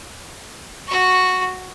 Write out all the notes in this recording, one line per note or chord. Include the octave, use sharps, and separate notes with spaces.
F#4 C#6